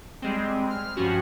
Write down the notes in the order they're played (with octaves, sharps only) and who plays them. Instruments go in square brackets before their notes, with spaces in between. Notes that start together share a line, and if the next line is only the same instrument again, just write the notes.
[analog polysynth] G3 G#3 C4
F6
G2 F3 C#4 F#4